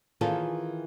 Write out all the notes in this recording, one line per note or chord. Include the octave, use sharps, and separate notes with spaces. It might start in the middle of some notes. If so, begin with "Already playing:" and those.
D#3 E3 C#4 F4 G#4 A4